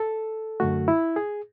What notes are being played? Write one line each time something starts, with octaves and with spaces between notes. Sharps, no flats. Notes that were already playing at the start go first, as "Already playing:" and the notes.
Already playing: A4
F#2 D3 A3 F#4
E4
G#4